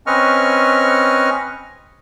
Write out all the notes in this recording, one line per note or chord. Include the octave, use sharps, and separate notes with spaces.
C4 C#4 B4 D#5 C#6 F6